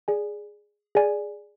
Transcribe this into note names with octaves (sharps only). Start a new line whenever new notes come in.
G#4 D5 G#5
G#4 D5 G#5